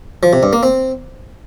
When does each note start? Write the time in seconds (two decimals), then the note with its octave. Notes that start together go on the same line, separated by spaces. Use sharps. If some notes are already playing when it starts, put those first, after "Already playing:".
0.23 F3
0.33 C3
0.43 G2
0.53 A#3
0.63 C4